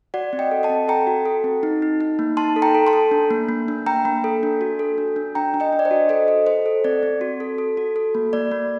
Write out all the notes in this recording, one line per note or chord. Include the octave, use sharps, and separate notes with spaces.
F#4 D5 F#5
C4
D#5 G5
A4
F#5 A5
C4
A4 G5 A#5
F#4
A4
C4
D#4
D#4
D#4
A#3
D#4 A5 C6
A4
G5 A#5
A4
A5 C6
A4
D4
A#3
A#3
D4
A#3 G5 A#5
A#3
A4
D4
F#4
A4
D4
D4
D4 G5 A#5
D4
D#5 G5
D4
D5
C5 D#5
F#4
A4 C5 D#5
A4
A4 C5
A4
C4 D5
C4
F#4
A4
A4
F#4
A4
A#3
A#3 D5
A#3